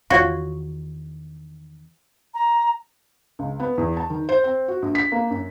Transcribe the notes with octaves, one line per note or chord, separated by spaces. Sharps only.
E2 D#3 F4 F#4 C#5 F5
A#5
C#2
B3
E2
A5
D#3
C5
C4
F#4
A#1
B6
A#3
F#2